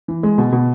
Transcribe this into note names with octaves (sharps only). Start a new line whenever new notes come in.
E3
G#3
B2
B2